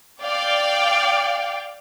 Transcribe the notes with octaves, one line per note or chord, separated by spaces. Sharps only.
D5 F5 G5